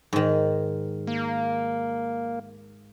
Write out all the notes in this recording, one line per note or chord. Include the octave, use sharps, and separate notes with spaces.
G#2 D#3
A#3